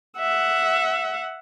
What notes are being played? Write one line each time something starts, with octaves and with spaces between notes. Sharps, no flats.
E5 F#5